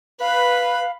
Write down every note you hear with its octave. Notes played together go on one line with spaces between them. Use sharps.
B4 F5 B5